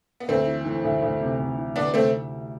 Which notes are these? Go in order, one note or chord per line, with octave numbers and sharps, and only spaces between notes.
B3
D2 A3 C4
E3
E3
D2
D2
C3
C3
E3
D2 B3 D4
C3 A3 C4